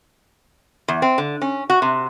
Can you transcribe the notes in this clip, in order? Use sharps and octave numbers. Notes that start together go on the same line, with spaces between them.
E2
C4
D3
C#4
F#4
C3